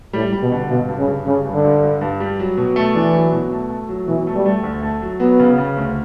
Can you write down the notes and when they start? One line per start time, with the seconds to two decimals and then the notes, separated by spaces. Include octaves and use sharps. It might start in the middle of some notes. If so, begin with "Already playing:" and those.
0.13 A2 G3
0.33 G3
0.42 B2
0.52 D3
0.70 G2 B2
0.89 G2
0.98 C#3
1.08 G2
1.26 C#3 G3
1.46 G2
1.54 D3
1.64 G2
1.83 G2
2.01 G2
2.20 G3
2.39 F#3
2.57 B2
2.76 A3
2.95 E3 D4
3.14 F#3
3.32 B2
3.51 A3
3.70 A3
3.89 F#3
4.07 B2 E3
4.27 A3
4.36 G3
4.46 A3
4.64 D2
4.83 A3
5.02 F#3
5.20 F#3 B3
5.39 C#3
5.58 C#3
5.77 D2